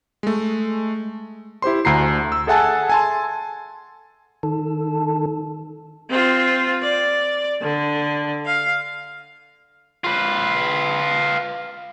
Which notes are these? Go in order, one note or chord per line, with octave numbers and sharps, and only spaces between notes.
G#3 A3
E4 G4 C5 C6
D2 D3 A#5 C7
E6
G#4 A4 E5 F#5 G#5 A5
G#5 A5 C6
D#3 A4
C4 F4
D5
D3
F5
F4 B4